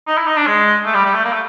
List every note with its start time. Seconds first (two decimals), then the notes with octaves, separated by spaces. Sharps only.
0.07 D#4
0.17 E4
0.27 D#4
0.37 D4
0.46 G#3
0.85 A3
0.95 G3
1.05 G3
1.14 A3
1.24 A#3
1.32 A3